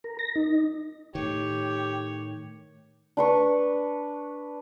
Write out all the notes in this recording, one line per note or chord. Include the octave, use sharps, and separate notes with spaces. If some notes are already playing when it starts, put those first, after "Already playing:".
A#4
A#6
D#4
A2 D#3 G4 C#5
D4 B4 C#6